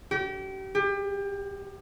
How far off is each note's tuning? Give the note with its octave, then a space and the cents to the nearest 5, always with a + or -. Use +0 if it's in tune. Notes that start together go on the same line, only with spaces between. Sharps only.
G4 -35
G4 +30